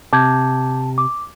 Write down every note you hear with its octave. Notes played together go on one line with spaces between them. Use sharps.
C3 A5 D6 G6 G#6
D6